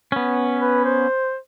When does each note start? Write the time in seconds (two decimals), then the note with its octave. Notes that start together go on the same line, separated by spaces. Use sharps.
0.12 B3 C#4
0.60 B4
0.85 C5